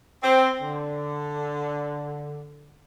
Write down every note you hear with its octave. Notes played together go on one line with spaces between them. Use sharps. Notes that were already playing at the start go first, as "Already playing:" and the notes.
C4
D3